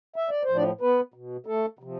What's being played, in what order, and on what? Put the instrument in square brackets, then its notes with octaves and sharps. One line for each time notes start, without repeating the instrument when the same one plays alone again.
[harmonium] E5
D5
C5
A2 F3
D4 D5
B3 B4
B2
A3 A4
C3 F3